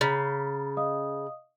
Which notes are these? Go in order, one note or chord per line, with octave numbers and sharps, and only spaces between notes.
C#3 A#5 B5 A6
D#5 F5 D#6